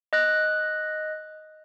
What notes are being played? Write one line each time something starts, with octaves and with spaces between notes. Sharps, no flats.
D#5 F#6 A#6